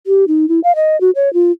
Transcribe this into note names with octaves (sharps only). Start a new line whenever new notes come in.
G4
D#4
E4
F5
D#5
F#4
C#5
F4